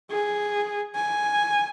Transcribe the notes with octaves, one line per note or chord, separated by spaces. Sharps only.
G#4
G#5